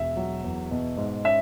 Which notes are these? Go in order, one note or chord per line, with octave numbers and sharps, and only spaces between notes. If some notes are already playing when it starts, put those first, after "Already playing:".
Already playing: E1 E5
F#3
E2
B2
G#2
C#4 E5